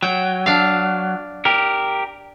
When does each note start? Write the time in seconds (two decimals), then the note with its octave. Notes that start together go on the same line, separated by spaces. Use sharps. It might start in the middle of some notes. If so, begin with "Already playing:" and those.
0.03 F#3 G5
0.46 D4 F5
1.45 G4 A#4